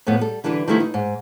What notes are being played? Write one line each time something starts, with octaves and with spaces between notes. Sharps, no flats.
F2 A2 A3 B3
G3 A4
D3 E3 G3 D4 A#4 B4
D#3 F3 G3 A3 D#4 E4
D#4
G#2